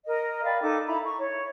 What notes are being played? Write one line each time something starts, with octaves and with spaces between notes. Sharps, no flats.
A#4 D#5
D5 F5 G5 B5
D#4 A4 D6
E4 A#5 B5
C#6
C#5